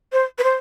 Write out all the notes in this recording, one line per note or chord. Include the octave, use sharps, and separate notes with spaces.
C5
B4
C5